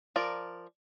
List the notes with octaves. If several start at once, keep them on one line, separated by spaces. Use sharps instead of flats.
F3 A#4 D5